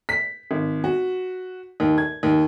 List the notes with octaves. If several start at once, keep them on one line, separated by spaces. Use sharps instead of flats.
B6
G#1
F#4
D#2
G#6
D#2